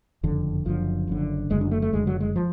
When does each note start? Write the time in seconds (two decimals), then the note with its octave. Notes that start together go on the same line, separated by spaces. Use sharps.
0.23 F#1 F2 D3
0.65 F#1 F#2 D3 F3
1.07 F#1 F#2 D3
1.50 F#1 F#2 D3 G#3
1.61 D4
1.71 A3
1.82 A3
1.93 F#1 F#2 D3 G#3
2.07 F#3
2.20 G#3
2.36 F3